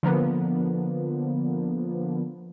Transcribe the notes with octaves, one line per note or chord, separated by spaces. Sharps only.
D3 F3 A#3 B3